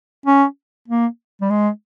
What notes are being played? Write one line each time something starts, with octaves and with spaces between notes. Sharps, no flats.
C#4
A#3
G3
G#3